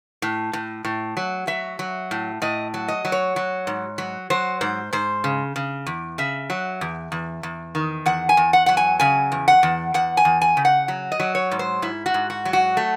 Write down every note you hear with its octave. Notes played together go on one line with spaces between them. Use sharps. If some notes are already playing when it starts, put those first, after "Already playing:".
A2
A2
A2
F#3
F#3 E5
F#3
A2
A2 D#5
F#3
D#5
F#3
C#5
F#3
G#2
F#3
F#3 C5
G#2 C5
G#2 C5
C#3
C#3
E2
C#3 E5
F#3
E2
E2
E2
D#3
E2 F#5
G#5
E2
F#5
F#3 F#5
G#5
C#3 G#5
E2
F#5
E2
E2 F#5
G#5
E2
G#5
C#3
F#5
F#3
D#5
F#3
C#5
G#2
C5
G#2 E4
F#4
G#2
F#4
F#3
F#4
A3